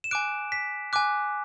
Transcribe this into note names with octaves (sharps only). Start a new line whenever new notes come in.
E7
G#5 D6 F#6 D7
B6
G#5 D6 F#6